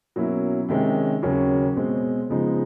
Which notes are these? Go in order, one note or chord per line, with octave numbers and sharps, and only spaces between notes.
B2 F#3 A#3 C#4 E4
C3 D#3 G#3 C#4
D#2 C#3 F#3 A#3 C#4
B2 G#3 C4
C#3 F3 G#3 B3 D#4